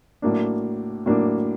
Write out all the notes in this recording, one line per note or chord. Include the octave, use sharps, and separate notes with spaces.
A2 F#3 A#3 D4
A2 F#3 A#3 D4